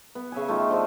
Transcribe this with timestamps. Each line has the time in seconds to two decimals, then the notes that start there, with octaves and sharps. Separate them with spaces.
0.15 B3
0.32 C#3 E5 G#5
0.48 A3 D#4 F4 G4
0.69 D3 F3 A4 D#5